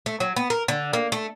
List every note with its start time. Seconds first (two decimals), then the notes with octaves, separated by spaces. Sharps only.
0.06 A3
0.20 F#3
0.36 B3
0.50 A#4
0.68 D3
0.93 A#3
1.12 A3